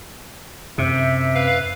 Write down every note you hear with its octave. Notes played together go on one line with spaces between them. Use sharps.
F#2 C3 E5
B4 F5